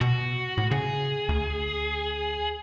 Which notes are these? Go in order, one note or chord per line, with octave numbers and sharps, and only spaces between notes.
B2 F#4
A2
C#3 G#4
D2